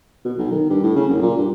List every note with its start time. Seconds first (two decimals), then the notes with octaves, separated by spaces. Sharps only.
0.25 B2
0.38 B1
0.51 D#3
0.70 G2
0.83 A2
0.96 C#3
1.09 F#1
1.22 A#2
1.37 G2